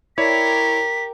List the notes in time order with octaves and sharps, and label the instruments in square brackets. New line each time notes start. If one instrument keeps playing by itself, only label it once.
[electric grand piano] E4 C#5 D5 [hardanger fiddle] G4 A#4 [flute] B6